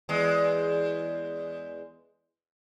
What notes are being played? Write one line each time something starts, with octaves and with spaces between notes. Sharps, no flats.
E2 G#3